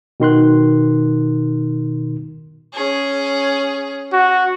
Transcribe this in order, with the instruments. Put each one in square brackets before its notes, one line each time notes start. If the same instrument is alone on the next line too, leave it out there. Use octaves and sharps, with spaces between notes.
[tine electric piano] B2 D#3 C6 F#6
[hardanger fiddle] C#4 G#4
[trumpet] F#4